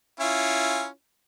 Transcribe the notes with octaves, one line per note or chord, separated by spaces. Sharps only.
C#4 E4 F4